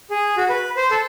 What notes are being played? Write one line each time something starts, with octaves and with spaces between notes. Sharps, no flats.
G#4
F#4
B4
C5
A4